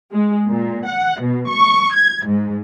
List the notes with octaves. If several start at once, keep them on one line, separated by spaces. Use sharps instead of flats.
G#3
A#2
F#5
B2
C#6
G#6
G#2